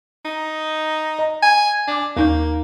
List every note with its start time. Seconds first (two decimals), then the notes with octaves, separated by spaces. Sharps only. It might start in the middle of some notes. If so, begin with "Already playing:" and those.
0.25 D#4
1.19 D#5 A#5
1.43 G#5
1.88 D4 G#5 D6
2.17 D#2 A#3 D#4 G6